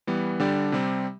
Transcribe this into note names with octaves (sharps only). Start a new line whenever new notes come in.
E3 G3 B3
D3 G3 D4 G4 D5
C3 G3 C4